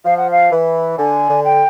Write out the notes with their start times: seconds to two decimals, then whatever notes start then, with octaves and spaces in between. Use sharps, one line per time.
0.05 F3 F5
0.17 F#5
0.31 F5
0.52 E3
0.98 D3 G#5
1.29 D3
1.45 G5